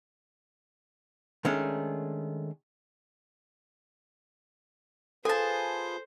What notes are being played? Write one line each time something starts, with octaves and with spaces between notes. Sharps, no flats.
D#3 G#3 A3 C#4 D4
F4 G#4 A4 B4 C5 G#5 A5